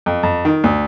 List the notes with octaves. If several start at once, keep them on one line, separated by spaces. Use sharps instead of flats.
F2
F2
D#3
D2